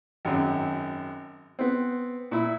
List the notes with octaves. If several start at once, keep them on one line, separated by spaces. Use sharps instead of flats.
G#1 F#2
B3 C4
A#2 E4